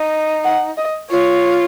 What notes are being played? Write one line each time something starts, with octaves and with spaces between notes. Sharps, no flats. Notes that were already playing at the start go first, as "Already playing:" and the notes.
Already playing: D#4
F#5
D#5
F4 C#5